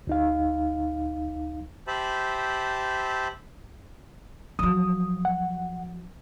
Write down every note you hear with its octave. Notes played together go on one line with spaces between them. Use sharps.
D2 D#4 F5
G4 C5 E5 A5 B5
F3 F#3 D#6
F#5